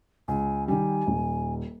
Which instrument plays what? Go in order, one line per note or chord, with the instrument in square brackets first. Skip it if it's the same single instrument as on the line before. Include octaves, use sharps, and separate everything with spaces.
[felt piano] C#2 [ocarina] G#5
[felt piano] D#3 G3 [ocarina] G#5
[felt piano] D#1